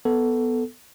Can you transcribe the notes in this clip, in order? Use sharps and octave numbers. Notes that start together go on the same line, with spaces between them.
B3 A4